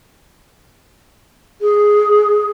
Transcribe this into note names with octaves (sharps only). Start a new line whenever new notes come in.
G#4